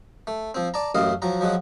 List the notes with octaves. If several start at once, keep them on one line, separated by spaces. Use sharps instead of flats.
A3
F3 C4
D5 A5 A#5
A1 F#2 A2 D#5 F5
F3 F#3 A#5
F3 F#3 G#3 F#4